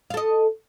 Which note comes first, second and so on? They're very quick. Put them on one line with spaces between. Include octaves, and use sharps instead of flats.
F5 A4 D#5